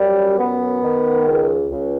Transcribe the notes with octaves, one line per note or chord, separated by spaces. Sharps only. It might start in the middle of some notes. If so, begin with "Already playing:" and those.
Already playing: F#2 G3
B3
D#3
C#2
C#2